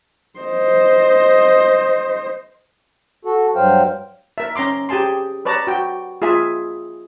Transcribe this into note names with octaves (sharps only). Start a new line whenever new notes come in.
C5 D#5
F#4 A4
G2 F#3 C5 F5 G5
A#4 E5
C#4 A#5 C6 D6
G4 G#4 G#5 A5 C6
B4 C#5 D5 A5 A#5
F#4 G5
F4 G#4 E5 G#5